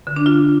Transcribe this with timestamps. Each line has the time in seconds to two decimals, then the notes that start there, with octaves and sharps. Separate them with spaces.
0.07 D3
0.16 D4
0.26 F4